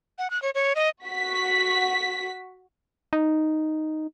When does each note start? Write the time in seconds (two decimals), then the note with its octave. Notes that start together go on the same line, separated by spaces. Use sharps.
0.18 F#5
0.30 F#6
0.42 C#5
0.55 C#5
0.75 D#5
1.06 F#4 B6
3.13 D#4